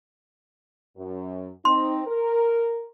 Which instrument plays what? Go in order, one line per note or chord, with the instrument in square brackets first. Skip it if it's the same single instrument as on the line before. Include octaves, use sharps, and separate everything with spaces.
[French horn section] F#2
[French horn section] C4 D#4 [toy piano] C6
[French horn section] A#4